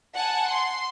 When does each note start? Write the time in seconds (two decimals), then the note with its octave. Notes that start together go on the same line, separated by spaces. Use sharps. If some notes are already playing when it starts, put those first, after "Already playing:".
0.15 F#5 G#5 A5
0.48 C6